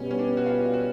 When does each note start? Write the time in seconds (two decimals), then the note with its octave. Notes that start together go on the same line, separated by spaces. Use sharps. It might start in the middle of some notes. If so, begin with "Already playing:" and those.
Already playing: B2 G3 B3 C#4
0.11 C#4
0.19 D4
0.37 F#4
0.46 F4
0.74 F#4